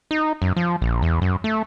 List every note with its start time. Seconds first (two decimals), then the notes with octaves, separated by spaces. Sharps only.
0.11 D#4
0.42 F#2
0.56 F3
0.82 A#1
1.02 E2
1.22 F#2
1.44 A3